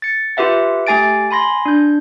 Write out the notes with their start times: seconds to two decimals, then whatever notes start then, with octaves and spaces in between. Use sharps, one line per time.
0.02 A6 C#7
0.37 F4 G4 B4 E5 F#5
0.87 A3 G4 G#5 A6 D7
1.31 G#5 B5 C6 A#6
1.66 D4 G6